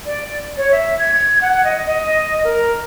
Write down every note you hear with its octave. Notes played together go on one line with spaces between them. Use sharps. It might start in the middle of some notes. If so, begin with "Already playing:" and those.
D5
C#5
E5
G#6
F#5
D#5
D#5
A#4